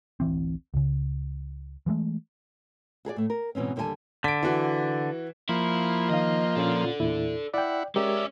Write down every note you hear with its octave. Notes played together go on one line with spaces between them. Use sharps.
D1 A1 E3 C4
C#2 C#3
E3 F3 G#3 A3
F#4 G#4 A4 D5
A2 A3
A#4
G#2 B2 E3 C4 C#4
D#2 D3 G3 B4 G#5 A5
D3 B6 D7
E3 F#4
F3 A#3 E4
D#3 D#4 D#5 F5
A#2 C#4 F4 A4 D5
E2 A#2 E4
E4 D5 F#5 G5
G#3 C#4 G4 A#4 D5 E5